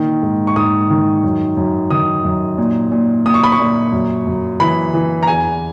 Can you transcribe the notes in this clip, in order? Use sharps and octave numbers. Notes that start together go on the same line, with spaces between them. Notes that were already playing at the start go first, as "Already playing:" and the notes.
Already playing: A#2 D#3
G#2
C#6
G#2 D#6
D#3
F#2
F#2
D#3 D#6
F#2
A#2
A#2
A#2 D#6
C#6
B5
C#6
A#2
F#2
F#2
E3 B5
E3
A#5
E2 G#5